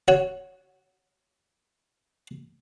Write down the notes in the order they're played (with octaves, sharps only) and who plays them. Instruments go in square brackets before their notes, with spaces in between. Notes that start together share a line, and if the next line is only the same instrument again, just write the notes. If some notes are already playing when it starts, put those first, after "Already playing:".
[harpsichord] F#4 C#5